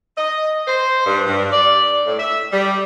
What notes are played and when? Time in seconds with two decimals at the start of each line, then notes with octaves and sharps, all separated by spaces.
0.16 D#5
0.67 C5
1.06 G2
1.26 G2
1.52 D5
2.06 A2
2.18 E5
2.52 G3